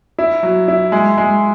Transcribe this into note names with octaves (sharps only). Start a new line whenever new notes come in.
E4
F#3
E4
G#3
G#3